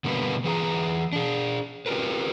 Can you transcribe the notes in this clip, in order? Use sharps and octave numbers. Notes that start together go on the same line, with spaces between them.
B2 D3 G3 A#3 D#4 B4
E3 G#4 F#5 A#5
D4 G#4
C4 F4 G4 A#4 B4